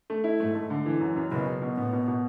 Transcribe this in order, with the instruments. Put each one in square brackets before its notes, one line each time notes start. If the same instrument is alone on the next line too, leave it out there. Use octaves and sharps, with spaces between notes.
[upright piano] A3
E4
[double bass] G#2 [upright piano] A3
[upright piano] A3
D3
E3
F#2
F#2
[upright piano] F#1 [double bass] B2
[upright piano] F#1
B2
[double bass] A2 [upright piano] B3
[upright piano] B2
B2